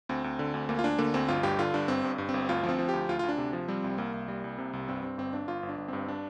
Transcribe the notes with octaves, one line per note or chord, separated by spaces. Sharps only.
D2 C4
D2
D3
D2
D2 A#3
F4
D2 D4
D3 A#3
D2 C4
G1 F4
G2 G4
D3 F4
G2 D4
G1 C4
G2
G2
C4
G1
D2 F4
F3
C4
F3
D2 G4
D2 F4
F4
D2
D4
C3
F3
G3 C4
C2
C2 A#3
C2
G3
C2
C3
C2
G2 C4
G2 C4
G1 C4
G1 D4
G1 F4
G1
D4
G1
G2 C4
D4